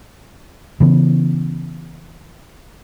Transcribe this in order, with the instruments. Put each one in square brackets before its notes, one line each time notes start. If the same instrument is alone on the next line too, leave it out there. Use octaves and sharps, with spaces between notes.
[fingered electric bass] C#3 E3 B3